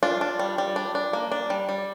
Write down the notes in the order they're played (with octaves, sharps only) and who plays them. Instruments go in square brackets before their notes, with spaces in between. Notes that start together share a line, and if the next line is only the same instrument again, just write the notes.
[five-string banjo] D4 F4
D4
G3
G3
D4
D4
A#3
D4
G3
G3